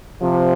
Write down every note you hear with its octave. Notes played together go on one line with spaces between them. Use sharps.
C3 F3